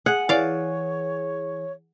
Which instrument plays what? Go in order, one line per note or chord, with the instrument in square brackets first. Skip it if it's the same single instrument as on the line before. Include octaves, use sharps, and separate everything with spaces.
[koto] G#4 [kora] F#5 [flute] G#5
[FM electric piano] E3 G#4 [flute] C#5 [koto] D5 F5